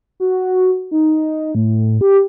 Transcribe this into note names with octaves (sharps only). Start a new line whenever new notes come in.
F#4
D#4
A2
G4